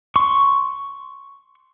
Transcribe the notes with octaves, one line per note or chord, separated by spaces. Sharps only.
C6 C#6